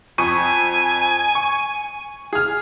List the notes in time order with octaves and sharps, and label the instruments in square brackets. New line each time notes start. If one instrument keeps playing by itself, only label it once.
[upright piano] F2 C#6 D#7 [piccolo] G#5
[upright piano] C#6
G#4 F6